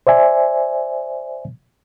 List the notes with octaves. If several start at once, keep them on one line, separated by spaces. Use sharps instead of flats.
C5 D5 E5 G#5